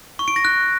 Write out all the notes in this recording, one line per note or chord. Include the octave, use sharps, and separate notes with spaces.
C#6
D7
A#6
F#6